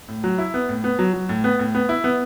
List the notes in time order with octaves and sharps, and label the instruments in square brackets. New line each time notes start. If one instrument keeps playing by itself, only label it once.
[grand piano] A2
F#3
E4
B3
A2
B3
F#3
F#3
A2
B3
A2
B3
E4
B3